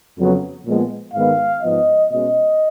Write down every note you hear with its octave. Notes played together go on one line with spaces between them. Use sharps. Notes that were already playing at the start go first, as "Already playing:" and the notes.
F2 C#3 F#3 B3
A#2 F3 G#3 B3
G#2 D#3 G#3 B3 F5
G#2 F3 B3 D#5
B2 G#3 C#4 D#5